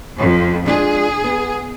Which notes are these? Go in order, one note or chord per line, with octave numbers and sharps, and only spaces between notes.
F2
G#3 D4 F4 G#4
B3